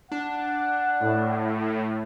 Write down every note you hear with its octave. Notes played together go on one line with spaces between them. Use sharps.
D4 F#5
A2